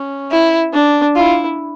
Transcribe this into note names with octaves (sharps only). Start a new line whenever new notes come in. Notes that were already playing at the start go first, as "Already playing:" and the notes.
Already playing: C#4
E4
D4
E4 F4